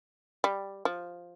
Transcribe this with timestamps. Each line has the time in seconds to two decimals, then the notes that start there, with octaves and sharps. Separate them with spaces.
0.44 G3
0.85 F3